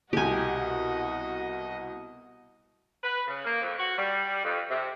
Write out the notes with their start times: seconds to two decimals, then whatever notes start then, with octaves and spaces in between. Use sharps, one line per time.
0.13 C2 B2 F#4 G4 D#5 G#5
3.03 B4
3.27 C#3
3.45 A#3
3.60 F2
3.78 F#4
3.98 G3
4.44 F2
4.70 C3